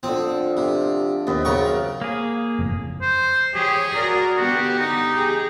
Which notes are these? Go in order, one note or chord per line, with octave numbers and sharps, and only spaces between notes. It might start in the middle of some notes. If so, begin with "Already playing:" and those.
D3 F3 C4
C3
D#2 B3 C4
F#2 C#3 A#4 C#6
A#3 G#4
F#1 F2 A2
C5
E3 G4 G#4 C#5
F#4 A#4 D5
D3 B3 F#4 G4
D#4
G4 G#4